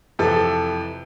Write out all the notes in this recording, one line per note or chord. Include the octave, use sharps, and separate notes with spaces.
F2 C3 E3 A4